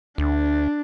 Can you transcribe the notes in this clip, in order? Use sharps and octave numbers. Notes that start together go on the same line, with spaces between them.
D2 D4